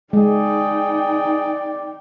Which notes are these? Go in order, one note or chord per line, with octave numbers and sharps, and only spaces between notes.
G#3 D#4 G#4 D5 G5